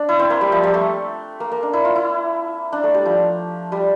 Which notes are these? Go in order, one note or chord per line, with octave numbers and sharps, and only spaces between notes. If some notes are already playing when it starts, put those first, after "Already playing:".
Already playing: D4
E4
C4
A#3
G3
F3
G3
A3
A#3
A#3
D4
E4
F4
E4
D4
A3
G3
F3
G3